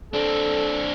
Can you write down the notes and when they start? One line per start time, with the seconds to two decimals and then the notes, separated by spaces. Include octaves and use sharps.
0.13 C4 D4 A4